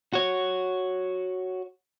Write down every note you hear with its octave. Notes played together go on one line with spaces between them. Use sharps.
F#4 C#5